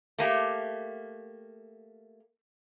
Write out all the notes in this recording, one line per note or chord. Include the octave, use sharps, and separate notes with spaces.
A3 A#3 G4